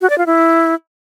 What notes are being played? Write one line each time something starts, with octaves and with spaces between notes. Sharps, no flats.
F#4
D5
F4
E4